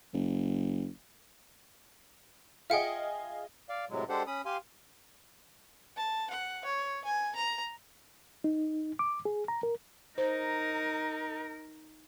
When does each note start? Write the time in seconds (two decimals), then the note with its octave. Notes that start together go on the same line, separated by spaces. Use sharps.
0.13 F#1
2.70 F4 G#4 D#5 E5 F#5 G5
3.69 D5 F5
3.89 A2 C3 F#3 G#3
4.09 G#3 D4 G4 A4 C5 F#5
4.27 C#4 B5 D#6
4.46 G4 F5 G#5 C6
5.96 A5
6.30 F#5
6.65 C#5
7.05 G#5
7.36 A#5
8.44 D#4
8.99 D6
9.25 G#4
9.48 A#5
9.63 A#4
10.18 D#4 A#4 C5